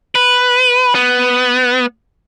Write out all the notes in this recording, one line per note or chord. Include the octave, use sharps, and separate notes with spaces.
B4
B3